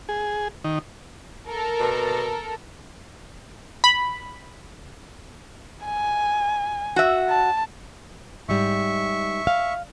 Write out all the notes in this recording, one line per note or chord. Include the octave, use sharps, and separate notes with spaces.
G#4
D#3
A4 A#4
B2
B5
G#5
F#4 E5
A5
G#2 G3 E5 C#6
F5